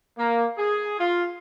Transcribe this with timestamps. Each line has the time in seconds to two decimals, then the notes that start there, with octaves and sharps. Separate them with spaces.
0.18 A#3
0.58 G#4
0.99 F4